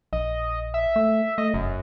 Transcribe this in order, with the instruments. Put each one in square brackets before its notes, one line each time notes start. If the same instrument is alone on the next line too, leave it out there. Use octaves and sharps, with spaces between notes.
[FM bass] A#1 [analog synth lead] D#5
[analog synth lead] E5
[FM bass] A3
[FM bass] A3 [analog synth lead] D#5
[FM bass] F1 [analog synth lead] F#2